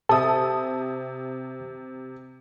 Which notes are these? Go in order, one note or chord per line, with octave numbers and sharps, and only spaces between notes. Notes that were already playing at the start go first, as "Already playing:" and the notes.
C3 A4 E5 A5 D#6